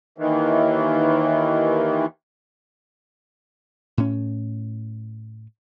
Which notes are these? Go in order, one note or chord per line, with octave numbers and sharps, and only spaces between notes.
D#2 D#3 E3
A2 C#4